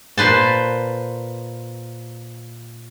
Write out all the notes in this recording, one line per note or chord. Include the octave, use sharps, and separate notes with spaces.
A#2 B4 C5 A5